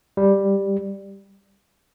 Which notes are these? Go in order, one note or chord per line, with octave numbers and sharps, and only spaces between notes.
G3